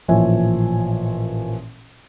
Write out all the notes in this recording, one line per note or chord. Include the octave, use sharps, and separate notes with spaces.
A1 A#2 F3 C#5 E5 G#5